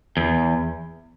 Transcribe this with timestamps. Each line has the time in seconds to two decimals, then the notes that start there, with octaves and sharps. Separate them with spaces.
0.17 E2